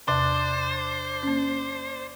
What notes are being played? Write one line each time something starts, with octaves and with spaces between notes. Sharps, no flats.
E2 C3 D4 C5
A#3 C#4